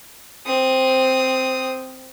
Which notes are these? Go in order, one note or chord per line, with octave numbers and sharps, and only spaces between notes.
C4 D#6